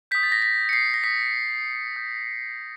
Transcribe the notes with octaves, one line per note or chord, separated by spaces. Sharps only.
D#6 G6 B6
A6
A#6
B6
C#7
C7
A#6
D#6 G6 B6
D#6 G6